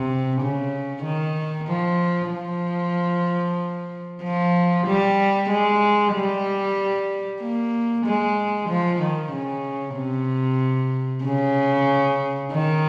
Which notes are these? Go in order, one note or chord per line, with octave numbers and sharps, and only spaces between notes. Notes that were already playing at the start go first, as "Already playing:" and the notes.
Already playing: C3
C#3
D#3
F3
F3
F3
G3
G#3
G3
A#3
G#3
F3
D#3
C#3
C3
C#3
D#3